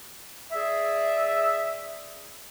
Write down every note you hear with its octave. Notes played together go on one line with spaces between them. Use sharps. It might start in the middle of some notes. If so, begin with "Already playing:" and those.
G#4 D5 E5